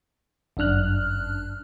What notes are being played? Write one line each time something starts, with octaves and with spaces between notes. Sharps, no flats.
G1 F#2 D4 F6 F#6